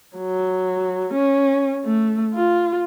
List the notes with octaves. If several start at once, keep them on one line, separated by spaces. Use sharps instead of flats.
F#3
C#4
A3
F4